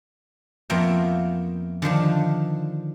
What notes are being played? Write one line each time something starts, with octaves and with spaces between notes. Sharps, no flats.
F2 A#3 B3 F4 E5 G5
D3 D#3 F3 D4